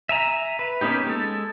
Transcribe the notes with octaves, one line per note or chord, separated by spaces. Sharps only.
E5 G#5 A#5
B4
A#3 B3 C#4 D#4 G4
G#3 A4